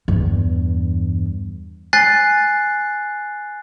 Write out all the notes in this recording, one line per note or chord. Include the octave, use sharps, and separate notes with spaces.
E2 G2
G#5 F#6 A6 C7